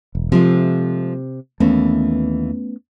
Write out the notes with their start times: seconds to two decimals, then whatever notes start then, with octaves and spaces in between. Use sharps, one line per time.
0.15 E1
0.32 C3 F3 G#3 A3
1.60 D#2 E3 A3 B3 C#4